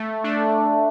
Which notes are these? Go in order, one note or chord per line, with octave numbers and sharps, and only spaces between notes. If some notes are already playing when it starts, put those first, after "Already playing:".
Already playing: A3
A3 D4